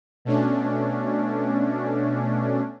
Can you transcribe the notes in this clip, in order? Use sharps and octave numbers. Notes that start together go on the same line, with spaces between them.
B2 A3 C#4 D4